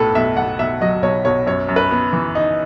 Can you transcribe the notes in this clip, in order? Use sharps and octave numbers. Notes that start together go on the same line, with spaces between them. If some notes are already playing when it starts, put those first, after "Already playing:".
Already playing: B1 A2 A4 B4
B1 E5
B1 F#5
B1 E5
F#3 D#5
B1 C#5
B1 C#5
F#2 C#5
F#2
B4
B3
E3
D#4